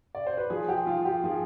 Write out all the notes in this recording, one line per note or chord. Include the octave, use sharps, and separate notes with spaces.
D5
C5
B4
F3 G#4
G4
F3 F4
G4
F3 G#4